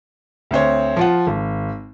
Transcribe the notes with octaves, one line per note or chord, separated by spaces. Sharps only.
D2 C4 C5 C#5
F3 F4 F#5
G#1